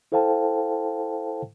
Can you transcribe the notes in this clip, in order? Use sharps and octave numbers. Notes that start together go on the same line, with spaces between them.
E4 A4 C5 F5 G5 A5